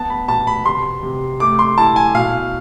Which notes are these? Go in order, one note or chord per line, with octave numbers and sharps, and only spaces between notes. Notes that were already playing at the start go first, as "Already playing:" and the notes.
Already playing: B3 A5
B5
B2 A5
B5
C3 C6
C3
A3 D6
C6
E4 A5
G#5
B2 F5